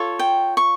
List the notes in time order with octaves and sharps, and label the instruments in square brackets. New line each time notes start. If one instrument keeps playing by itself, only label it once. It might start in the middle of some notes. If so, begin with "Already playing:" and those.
Already playing: [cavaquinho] F4 A4 C#5
G5
C#6